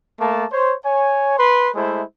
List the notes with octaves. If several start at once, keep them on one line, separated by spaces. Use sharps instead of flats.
A3 A#3 A5
C5 C#5
C#5 G#5
B4 C6
G#3 A3 E4 C5